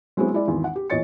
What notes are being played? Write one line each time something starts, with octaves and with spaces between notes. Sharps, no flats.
F#3 G#3 B3 C4 E4
G#3 E4 D5
G#1 E2
F#5
G4
E2 A#2 C#5 D#5 A6 C#7